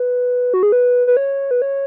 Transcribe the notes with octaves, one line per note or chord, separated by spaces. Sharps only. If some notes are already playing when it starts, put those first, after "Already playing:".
Already playing: B4
F#4
G#4
B4
B4
C#5
B4
C#5